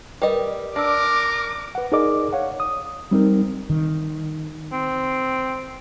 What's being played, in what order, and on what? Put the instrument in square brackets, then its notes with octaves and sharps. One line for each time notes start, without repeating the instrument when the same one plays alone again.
[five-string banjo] G3 D#5 [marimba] A#4 B4
[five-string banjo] D4 [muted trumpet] A#4 [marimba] D5 E6 [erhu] D6
[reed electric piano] B4 F#5
D#4 G#4 A#4 D5 D#5 D6
C#5 F5 F#5
D#6
G3 C4 D#4 A#4
[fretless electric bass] D#3
[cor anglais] C4